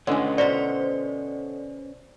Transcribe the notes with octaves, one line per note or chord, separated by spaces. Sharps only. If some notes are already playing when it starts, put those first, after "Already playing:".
D3 G#3 C#4 A4 B4 C#5 D#5 F#5
B2 F#4 C5 D5